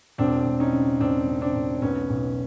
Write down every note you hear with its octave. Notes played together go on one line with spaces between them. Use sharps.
E1 C4 D4
E1
C#4 D#4
C#3
E1 C4 D4
C#3
C4 D4
E1
B1 B3 C#4
B1